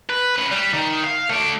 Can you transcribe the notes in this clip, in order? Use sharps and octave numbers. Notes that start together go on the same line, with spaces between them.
B4
C#4 B4
G3
D#3
F5
A3 D5